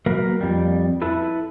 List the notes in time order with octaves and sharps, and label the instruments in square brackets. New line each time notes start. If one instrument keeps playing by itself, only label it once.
[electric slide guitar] F#3 A#3 A#4 B4
F2 G3
E4 A4 B4